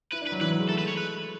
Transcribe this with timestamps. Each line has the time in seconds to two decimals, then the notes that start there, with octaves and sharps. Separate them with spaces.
0.12 E4 B4
0.22 D4
0.27 B4
0.32 F#3
0.41 E3 B4
0.51 F#3
0.59 G#3
0.69 A3 A4
0.78 B4
0.83 G#3 C#5
0.97 B4